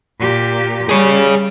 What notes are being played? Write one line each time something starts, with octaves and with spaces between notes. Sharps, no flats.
A#2 G4
G3 G#4 C#5